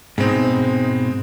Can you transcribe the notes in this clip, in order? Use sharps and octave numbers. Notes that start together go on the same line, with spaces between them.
G#2 B2 G#3 C4 D#4